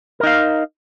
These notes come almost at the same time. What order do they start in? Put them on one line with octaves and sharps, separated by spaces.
A#4 D#4 F5